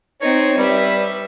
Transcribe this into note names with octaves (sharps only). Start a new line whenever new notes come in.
C4 D#4 C#5
G3 B4 E5